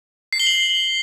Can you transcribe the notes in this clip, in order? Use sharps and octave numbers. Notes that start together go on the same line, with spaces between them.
C7
G7
F#7